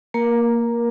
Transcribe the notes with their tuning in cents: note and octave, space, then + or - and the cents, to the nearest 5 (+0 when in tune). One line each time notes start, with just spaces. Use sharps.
A#3 +0 A#4 +20